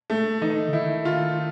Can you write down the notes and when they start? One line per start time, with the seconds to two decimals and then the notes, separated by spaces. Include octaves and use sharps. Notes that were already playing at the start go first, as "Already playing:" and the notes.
0.10 A3
0.41 E3 D#4
0.67 D3
0.73 D#3 E4
1.05 F4